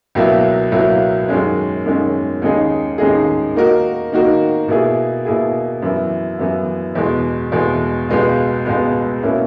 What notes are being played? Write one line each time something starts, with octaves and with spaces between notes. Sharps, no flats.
C#2 B2 F#3 A#3 E4
C#2 B2 F#3 A#3 E4
F#2 D#3 G#3 C#4
F#2 D#3 G#3 C#4
D#2 C#3 G#3 D#4 G#4
D#2 C#3 G#3 D#4 G#4
D#3 A#3 D#4 F#4 A#4
D#3 A#3 D#4 F#4 A#4
B2 A#3 E4 G#4
B2 A#3 E4 G#4
F#2 E3 B3 E4
F#2 E3 B3 E4
E2 B2 G#3
E2 B2 G#3
C#2 B2 G#3 B3
C#2 B2 G#3 B3
B2 A#3 C#4 E4